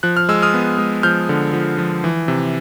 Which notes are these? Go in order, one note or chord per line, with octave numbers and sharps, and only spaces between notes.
F3 F#6
F6
G#3 E6
D#6 F6
B3
G#3
F3 F6 G6
D3
F3
F3
E3
C3